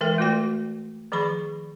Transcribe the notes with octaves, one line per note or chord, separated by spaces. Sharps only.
E3 G#3 A4 A#4 E5 G5
A3 F4 F#4 D5 G5
D#3 F3 G#4 D5 B5 C#6